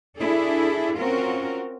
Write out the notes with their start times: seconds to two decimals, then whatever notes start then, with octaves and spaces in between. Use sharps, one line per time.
0.19 D4 E4 G#4 A4
0.98 C4 C#4 F4 F#4 A#4